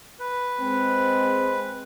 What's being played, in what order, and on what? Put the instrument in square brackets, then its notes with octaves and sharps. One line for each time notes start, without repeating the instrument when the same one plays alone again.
[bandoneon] B4
[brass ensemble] G#3 C4